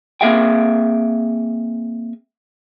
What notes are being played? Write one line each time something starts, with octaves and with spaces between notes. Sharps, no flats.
A#3 C4 G#4 E5 F5 G5